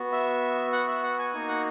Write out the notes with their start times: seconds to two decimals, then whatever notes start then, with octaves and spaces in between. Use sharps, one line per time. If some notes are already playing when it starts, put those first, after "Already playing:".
Already playing: B3 F#4
0.12 E5
0.72 F#5
0.88 E5
1.03 F#5
1.19 G#5
1.33 A#3 D#4 F#4 G#5
1.48 F#5